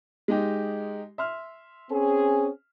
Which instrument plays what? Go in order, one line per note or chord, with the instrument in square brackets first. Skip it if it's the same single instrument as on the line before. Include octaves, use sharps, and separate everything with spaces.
[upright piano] G#3 D#4 G4
E5 C6 F6
[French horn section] C4 C#4 G#4